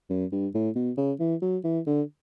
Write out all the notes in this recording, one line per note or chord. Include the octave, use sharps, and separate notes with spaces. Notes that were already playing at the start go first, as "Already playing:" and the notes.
F#2
G2
A2
B2
C#3
E3
F#3
E3
D3